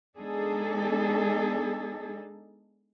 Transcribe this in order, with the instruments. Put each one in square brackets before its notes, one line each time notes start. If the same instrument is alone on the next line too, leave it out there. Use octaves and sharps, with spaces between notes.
[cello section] G#3 B3 D4 D#4 G#4 A4